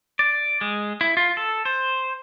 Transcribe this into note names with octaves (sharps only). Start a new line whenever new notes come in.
D5
G#3
E4
F4
A4
C5